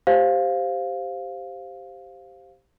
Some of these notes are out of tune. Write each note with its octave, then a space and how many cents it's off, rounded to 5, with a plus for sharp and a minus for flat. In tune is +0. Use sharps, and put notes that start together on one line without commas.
G4 +0 C5 +5 F5 +5